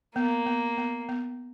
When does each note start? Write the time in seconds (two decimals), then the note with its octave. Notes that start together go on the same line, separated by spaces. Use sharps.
0.16 A#3 B3
0.46 B3
0.78 B3
1.09 B3